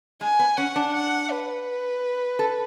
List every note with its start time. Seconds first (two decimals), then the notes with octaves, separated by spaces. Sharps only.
0.21 G#3 G#5
0.39 B3
0.57 C#4 F#5
0.76 D4
0.93 F#5
1.31 B4
2.39 A4